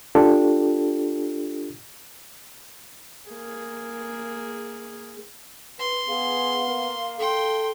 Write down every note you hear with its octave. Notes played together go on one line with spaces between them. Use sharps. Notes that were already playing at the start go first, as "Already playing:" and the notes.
D4 F4 G4 A4
A#3 G#4
B4 C6
B3 G#4 F5
A#3
A4 G5 C6